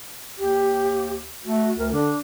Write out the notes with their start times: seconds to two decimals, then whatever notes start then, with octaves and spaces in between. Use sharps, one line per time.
0.38 D#2 G4
1.45 A3 F#4
1.78 D2 A#4
1.92 D3 D4